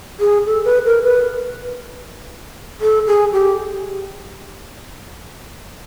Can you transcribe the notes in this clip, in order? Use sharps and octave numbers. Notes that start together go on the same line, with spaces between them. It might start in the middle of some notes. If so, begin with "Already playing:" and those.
G#4
A4
B4
A#4
B4
A4
G#4
G4